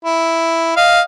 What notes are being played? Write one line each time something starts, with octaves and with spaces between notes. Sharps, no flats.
E4
D#5 F5